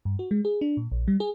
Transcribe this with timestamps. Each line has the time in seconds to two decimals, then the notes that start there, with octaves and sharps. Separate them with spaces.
0.05 G2
0.19 F#4
0.31 G#3
0.45 G#4
0.61 D4
0.77 A#2
0.92 A#1
1.08 G3
1.20 G#4